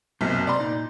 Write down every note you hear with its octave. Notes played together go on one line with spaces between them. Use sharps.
B1 F#2 C3 A#3 B3
D5 A#5 C6
A#2 D#4